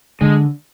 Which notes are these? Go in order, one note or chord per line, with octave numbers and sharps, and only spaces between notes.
D3 G#3